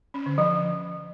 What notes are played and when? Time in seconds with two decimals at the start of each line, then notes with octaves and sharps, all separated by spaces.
0.14 C#4
0.26 D3
0.38 F3